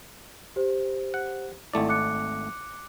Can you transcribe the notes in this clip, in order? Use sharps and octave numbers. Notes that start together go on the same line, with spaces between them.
G4 C5
F#5
G#1 A3 E4 D5
D6 F#6 C#7